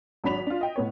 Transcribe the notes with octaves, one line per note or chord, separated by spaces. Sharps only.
G#1 F#3 D4 B5 B6 F7
D4 F4
D#5 G5
A2 B3 C#5